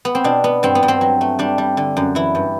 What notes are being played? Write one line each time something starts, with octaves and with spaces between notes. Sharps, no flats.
B3
C4
B2 D4
B3
G2 C4
B3
G2
C4
F#3
A3
G3 D4
G3
D3
F#2
E3 E4
G2